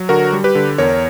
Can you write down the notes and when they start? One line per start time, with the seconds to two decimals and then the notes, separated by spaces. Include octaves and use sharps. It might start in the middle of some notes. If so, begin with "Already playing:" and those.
Already playing: F#3
0.09 D3 F#4 A#4
0.33 G3
0.44 G4 B4
0.55 D3
0.78 E2 A#4 C#5